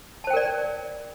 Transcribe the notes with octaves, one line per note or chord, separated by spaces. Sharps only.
A#4 C5 D5 G5 A5